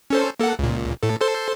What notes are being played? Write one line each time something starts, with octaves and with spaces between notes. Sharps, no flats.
C#4 A4 C5
A#3 A4 F#5
C#2 A#2
A2 A4
A4 C5 C6